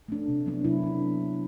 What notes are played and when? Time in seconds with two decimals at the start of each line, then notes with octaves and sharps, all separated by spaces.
0.09 A3 D4
0.28 C3
0.46 F#3 B3 D4
0.64 C3 E4
0.82 F#3 B3 D4